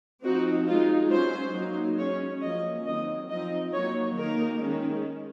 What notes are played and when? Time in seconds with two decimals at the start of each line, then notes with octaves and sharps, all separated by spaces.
0.24 F3 C4 D#4 F#4
0.67 G#3 D#4 F4
1.11 F#3 C#4 C5
1.54 F#3 A#3 D#4
1.98 G#3 C#4 C#5
2.42 F3 A#3 C#4 D#5
2.86 D#3 F#3 C4 D#5
3.29 F3 C4 D#4 D#5
3.73 F#3 A#3 D#4 C#5
4.17 D#3 A#3 D#4 A#4
4.60 D#3 G#3 C#4